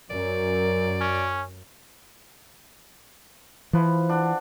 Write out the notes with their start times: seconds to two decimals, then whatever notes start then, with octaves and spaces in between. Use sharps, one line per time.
0.10 F#2 F#3 A#4 D5
1.01 C#4
3.73 E3 F3 B4
4.09 D4 F#5